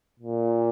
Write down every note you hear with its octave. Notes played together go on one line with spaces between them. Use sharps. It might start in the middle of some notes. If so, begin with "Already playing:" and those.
A#2